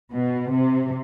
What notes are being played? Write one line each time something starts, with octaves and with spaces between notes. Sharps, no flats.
B2
C3